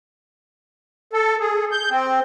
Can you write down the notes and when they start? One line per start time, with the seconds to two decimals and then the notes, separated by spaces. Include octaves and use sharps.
1.13 A4
1.40 G#4
1.71 G6
1.91 C4